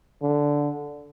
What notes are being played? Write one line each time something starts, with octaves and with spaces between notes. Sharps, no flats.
D3